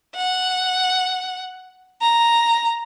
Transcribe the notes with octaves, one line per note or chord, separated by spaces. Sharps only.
F#5
A#5